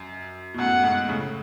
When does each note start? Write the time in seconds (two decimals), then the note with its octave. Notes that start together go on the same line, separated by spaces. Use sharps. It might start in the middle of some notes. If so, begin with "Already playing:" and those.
Already playing: F#2
0.54 B2
0.59 F#2 A2 F#5
0.84 G#2 B2
1.09 A2 C#3